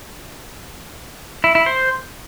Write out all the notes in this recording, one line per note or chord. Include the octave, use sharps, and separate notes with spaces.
E4
E4
C5